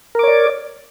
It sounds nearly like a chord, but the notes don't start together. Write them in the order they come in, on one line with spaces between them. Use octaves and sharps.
A#4 D6 C#5 D5